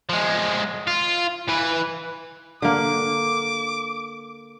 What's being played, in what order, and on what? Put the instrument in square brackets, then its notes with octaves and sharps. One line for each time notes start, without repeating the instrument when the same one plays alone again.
[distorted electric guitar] F3 G#3
F4
E3 B4
[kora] D3 A#3 [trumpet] D6